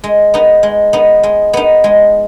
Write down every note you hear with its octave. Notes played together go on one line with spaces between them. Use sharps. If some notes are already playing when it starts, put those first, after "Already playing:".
G#3
B3 D#4
G#3
B3 D#4
G#3
B3 D#4
G#3